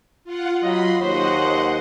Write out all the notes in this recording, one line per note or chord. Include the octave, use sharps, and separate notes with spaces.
F4 F#5
F#3 F4 D#5 B5 C6
D#2 C5 C#5 D#5 F#5